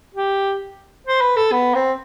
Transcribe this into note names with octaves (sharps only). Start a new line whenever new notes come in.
G4
C5
B4
A4
B3
C4